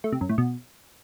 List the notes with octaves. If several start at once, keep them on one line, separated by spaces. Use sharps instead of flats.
A3
C3
F#2
A2
B2